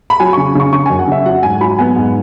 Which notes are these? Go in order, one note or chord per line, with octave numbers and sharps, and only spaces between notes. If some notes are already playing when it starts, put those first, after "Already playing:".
B5
F#3 G#5
C#3 C#6
C#3 C#6
C#3 C#6
F#2 G#5
F#5
C#3 E5
F#3 F#5
G#2 G#5
F#3 B5
B3 G#5
G#2